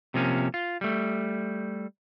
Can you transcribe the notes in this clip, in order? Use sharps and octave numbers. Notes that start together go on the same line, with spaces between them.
C3 F3 A#3 C#4
F4
G3 A3